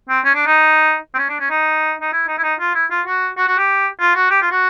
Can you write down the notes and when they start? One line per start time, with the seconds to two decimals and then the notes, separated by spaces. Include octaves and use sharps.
0.09 C4
0.25 C#4
0.35 D4
0.46 D#4
1.14 C4
1.18 C#4
1.29 D4
1.40 C#4
1.50 D#4
2.01 D#4
2.13 E4
2.28 D#4
2.38 E4
2.43 D#4
2.59 F4
2.75 E4
2.90 F4
3.06 F#4
3.37 F#4
3.47 F#4
3.58 G4
4.00 F4
4.15 F#4
4.30 G4
4.41 F4
4.51 F#4